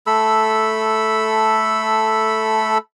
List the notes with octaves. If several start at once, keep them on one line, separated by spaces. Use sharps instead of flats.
A3 A4 B5 E6